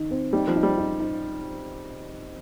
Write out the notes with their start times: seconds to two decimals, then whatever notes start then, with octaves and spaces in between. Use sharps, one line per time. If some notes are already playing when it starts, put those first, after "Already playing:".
Already playing: D#3 D#4
0.11 C4
0.33 G3 D#4
0.48 F3
0.56 D#4
0.63 G3
0.78 D#4
1.00 D#4